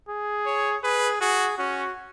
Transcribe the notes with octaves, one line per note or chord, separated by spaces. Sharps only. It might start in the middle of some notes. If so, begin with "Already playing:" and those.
G#4
C#5
G#4 B4
F#4 G#4
C#4 F#4